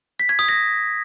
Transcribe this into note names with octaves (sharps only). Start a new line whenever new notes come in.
B6
G#6
D#6
A#6